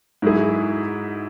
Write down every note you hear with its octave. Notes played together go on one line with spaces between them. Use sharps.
G#2 F#3 E4 G#4